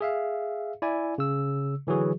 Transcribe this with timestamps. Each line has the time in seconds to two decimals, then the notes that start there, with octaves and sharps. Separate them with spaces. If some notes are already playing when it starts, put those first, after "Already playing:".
0.01 G#4 E5 F5
0.82 E4 D5 G#5
1.18 C#3 E6
1.87 D3 E3 F#3 F#4 G#4